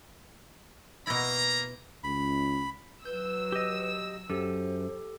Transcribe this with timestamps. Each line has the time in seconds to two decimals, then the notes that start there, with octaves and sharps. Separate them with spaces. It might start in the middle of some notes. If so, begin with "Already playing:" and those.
1.07 B2 A#3 E4 A#5
2.04 C#2 B5
3.05 F#3 B4 E6 G6
3.52 G4 D#5
4.30 F#2 G4 A4 C5